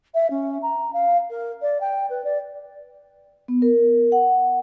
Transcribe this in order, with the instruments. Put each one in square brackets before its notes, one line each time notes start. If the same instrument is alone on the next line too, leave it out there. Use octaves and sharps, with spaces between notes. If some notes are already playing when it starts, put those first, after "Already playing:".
[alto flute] E5
C#4
A#5
F5
A#4
D5
G5
B4
D5
[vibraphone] B3
A#4
F#5